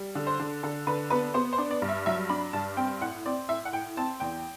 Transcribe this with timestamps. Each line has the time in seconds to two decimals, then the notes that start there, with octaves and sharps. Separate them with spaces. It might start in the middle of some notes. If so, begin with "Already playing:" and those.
Already playing: G3
0.15 D3
0.27 C5
0.40 D3
0.63 D3 A4
0.87 D3 B4
1.10 B3 B4
1.34 B3 C5
1.53 C5
1.58 D4
1.71 D5
1.82 G2
1.89 E5
2.06 F#3 E5
2.29 D4 B5
2.53 G2 A5
2.77 C4 G5
3.01 A2 F#5
3.26 C4 D5
3.48 A2 E5
3.65 F#5
3.72 A2 G5
3.97 C4 A5
4.20 E2 G5